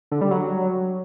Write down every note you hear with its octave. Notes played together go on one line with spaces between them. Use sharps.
D3
G3
F#3